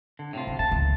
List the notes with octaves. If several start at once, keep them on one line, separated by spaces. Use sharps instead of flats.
D3
A2 C3 F4
D3
A#2 A5
C#2 A2 A#3